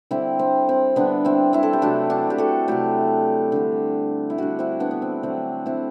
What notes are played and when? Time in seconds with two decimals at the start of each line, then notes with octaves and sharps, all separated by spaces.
0.11 D3 G3 C4 E4
0.39 C4
0.69 C4
0.96 D3 G3 B3 D4
1.25 C4 E4
1.53 C4 E4
1.63 A4
1.73 G4
1.82 C3 F#3 A3 D4 F#4
2.10 D4 F#4
2.30 G4
2.38 F#4 A4
2.68 C3 F#3 A3 E4 G4
3.52 D3 G3
4.30 E4
4.38 D3 G3 D4 F#4
4.59 C4 E4
4.80 B3 D4
4.91 B3
5.02 C4
5.23 D3 F#3 A3 C4
5.66 C4 E4